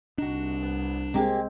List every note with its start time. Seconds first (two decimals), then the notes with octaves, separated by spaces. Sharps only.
0.18 C2 D4 D#4 F#4
0.63 B3
1.14 G#3 A#3 C4 G4 G#4